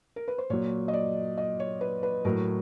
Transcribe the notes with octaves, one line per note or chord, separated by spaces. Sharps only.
A#4
B4
C5
A#2 F#3 C#5
D#5
D5
D#5
C#5
B4
B4
A2 F#3 A#4